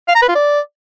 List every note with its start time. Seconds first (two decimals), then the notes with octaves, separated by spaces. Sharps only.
0.08 F5
0.15 A#5
0.22 B4
0.29 F4
0.35 D5